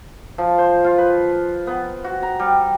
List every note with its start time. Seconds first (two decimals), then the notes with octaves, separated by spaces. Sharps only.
0.38 F3
0.58 C5
0.84 F4
0.98 B4
1.67 B3
2.04 F#4
2.23 A#5
2.40 G3